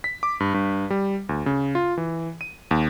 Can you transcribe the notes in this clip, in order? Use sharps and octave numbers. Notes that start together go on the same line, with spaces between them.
B6
D6
G2
G2
G3
D2
C#3
F4
E3
D#7
D#2